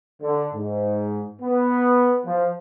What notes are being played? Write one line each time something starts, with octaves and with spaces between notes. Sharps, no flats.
D3
G#2
B3
F3